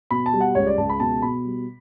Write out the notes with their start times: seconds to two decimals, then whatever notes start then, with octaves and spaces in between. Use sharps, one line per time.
0.11 B2 B5
0.26 A5
0.33 G3
0.40 F#5
0.55 C#2 C#5
0.67 D5
0.78 C#2 A5
0.89 B5
1.00 B2 A5
1.22 B2 B5
1.45 G3